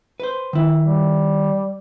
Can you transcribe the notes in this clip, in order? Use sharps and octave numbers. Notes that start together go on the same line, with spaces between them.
B4 C5
D#3 E4
G3